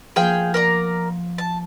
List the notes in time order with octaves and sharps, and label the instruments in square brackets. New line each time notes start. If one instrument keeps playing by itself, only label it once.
[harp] F3 A#3 B3 [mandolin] G#4 F5 G5
[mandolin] A#4 D5 A#5
A5